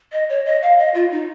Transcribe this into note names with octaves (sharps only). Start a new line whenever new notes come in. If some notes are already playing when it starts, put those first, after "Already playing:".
D#5
C#5
D#5
F5
D#5
F4
D#4